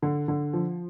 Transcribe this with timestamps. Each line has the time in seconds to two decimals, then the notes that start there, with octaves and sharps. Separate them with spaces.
0.02 D3
0.28 D3
0.53 F3